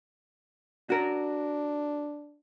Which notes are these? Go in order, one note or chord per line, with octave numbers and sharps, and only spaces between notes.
D4 F#4 A#4